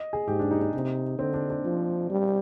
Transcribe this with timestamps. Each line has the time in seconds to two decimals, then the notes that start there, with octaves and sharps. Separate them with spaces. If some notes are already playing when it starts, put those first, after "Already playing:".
Already playing: D#5
0.13 G#4
0.28 G#2 G4
0.39 D4
0.51 D#4
0.62 D#4
0.74 C3
1.18 D3 C4
1.34 D4
1.50 D4
1.64 F3
2.10 G3